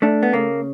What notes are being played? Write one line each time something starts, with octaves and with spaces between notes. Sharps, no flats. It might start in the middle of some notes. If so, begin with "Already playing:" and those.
A3 D4
B3
C#3 A#3